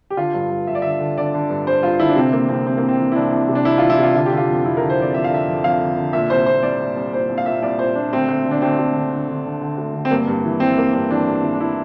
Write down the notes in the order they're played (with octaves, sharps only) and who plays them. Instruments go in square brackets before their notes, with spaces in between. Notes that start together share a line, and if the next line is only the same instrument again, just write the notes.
[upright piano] G4
D3 F4
G2
G2
G2 E5
D5
D3 E5
D3
D3 D5
D3
G2
G2 C5
G2 F4
D3 E4
D4
C3 C4
E3 A#3
C2 C4
C2 C4
A#3
C2
C4
E3
E4
C2 D4
C2
C3
D4
C2 E4
E3 F4
E4
C3 F4
D3 F4
G4
D3
F4
F2
F2 E4
A#4
D3
C5
F2 D5
F2 E5
F5
D3 E5
F2
F2 F5
D3
D3
A#2 E5
C2 C5
A#2 C5
C2 D5
C2
C2
A#2 C5
C2
F5
A#2 E5
C2 D5
A#2 C5
A#2 D4
D2 C4
D2
D3
D4
D2 C4
D2
D3
D3
D3
D3
D3
D2
D3
C4
G2 A#3
G2
E3
E3 C4
G2 A#3
G2 C4
E3 D4
G2
E3
D4
E3 E4